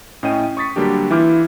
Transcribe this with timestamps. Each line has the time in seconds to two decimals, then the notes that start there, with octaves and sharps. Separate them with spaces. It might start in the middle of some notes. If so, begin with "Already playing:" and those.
0.23 A2 C#4 D#5 G5 D#7
0.57 C#6 D#6 A6 B6 C#7
0.76 D3 F#3 G3 A#3 D4 G4
1.10 E3 E4 F4 D6 F6 G6